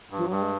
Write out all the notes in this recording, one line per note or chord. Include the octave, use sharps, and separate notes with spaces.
G2
F3
F#3
G2 G3
G#3